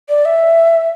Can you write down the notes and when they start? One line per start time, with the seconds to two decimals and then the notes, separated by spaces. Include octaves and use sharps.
0.09 D5
0.25 E5